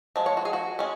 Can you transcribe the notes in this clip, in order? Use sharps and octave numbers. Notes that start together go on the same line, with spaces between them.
F3 G#3
C#5
F#4
G#4
F#4
G#3 C#4